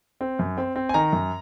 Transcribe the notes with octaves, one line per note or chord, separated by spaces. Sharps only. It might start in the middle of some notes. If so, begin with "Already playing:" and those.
C4
F#2
C4
C4
G#5
D#3 A#5
F#2